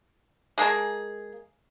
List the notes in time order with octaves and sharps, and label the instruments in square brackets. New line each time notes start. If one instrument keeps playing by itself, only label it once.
[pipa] G#3 A#3 G#4 A5